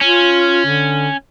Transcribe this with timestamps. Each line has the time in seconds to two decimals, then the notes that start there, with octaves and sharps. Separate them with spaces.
0.01 C#4 F4
0.66 D3